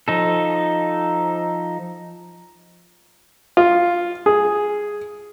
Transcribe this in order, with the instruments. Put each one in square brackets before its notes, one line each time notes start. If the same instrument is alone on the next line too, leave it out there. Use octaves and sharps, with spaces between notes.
[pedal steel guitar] F3 D#4 A4
[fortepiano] F4
G#4